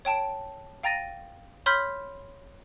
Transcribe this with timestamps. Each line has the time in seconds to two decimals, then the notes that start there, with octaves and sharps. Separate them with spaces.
0.05 C#5 G5 A5 D7
0.83 F5 G5 A#5 A6 A#6 D#7
1.66 C#5 B5 C6 F6 G6 B6